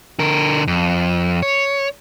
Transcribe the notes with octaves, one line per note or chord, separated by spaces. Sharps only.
D3 A#4
F2
C#5